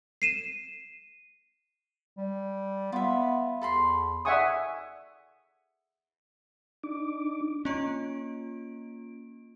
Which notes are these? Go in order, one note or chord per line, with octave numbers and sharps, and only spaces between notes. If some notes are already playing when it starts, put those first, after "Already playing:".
C7 D#7 E7
G3
B3 F4 E5
E2 A4 B5 C6
D5 E5 F#5 G#5 C#6 D#6
D4 D#4 D6
A#3 C#4 F4 D7